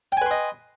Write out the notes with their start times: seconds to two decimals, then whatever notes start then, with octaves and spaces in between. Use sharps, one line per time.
0.12 G5
0.17 G#5
0.22 B4
0.26 C6
0.31 D#5